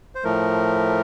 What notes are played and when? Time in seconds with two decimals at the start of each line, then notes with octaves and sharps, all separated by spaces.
0.15 C5
0.24 A2 F3 A3 A#4